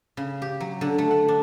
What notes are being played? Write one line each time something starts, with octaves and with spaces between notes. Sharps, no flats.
C#3
G4
F#3
D3
A3
F#5
D4